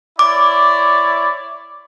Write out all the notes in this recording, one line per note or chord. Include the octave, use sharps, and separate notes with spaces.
E4 C#5 D5 D6